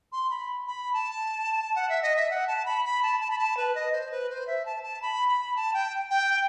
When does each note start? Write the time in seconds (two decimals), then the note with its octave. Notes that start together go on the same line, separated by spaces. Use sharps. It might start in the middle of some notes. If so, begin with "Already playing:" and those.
0.12 C6
0.30 B5
0.67 B5
0.93 A5
1.76 F#5
1.89 E5
2.02 D#5
2.16 E5
2.30 F#5
2.47 A5
2.66 B5
2.85 B5
3.03 A5
3.20 A5
3.31 B5
3.39 A5
3.57 B4
3.75 D#5
3.92 C5
4.11 B4
4.30 C5
4.47 E5
4.66 A5
4.83 A5
5.02 B5
5.28 B5
5.56 A5
5.74 G5
6.10 G5